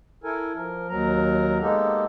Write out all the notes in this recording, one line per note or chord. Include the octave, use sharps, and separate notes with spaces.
E4 A4 A#4 G#5
F3 A#4
D#2 F#3 A#4 A#5
G#3 A#3 B3 D#4 G4 A4